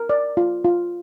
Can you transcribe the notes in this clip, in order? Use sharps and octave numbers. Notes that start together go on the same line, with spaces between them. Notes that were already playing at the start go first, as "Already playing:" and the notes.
Already playing: A#4
D5
F4
F4